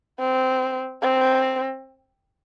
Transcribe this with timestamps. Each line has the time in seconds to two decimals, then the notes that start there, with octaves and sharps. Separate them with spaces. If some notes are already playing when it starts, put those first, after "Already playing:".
0.19 C4
1.02 C4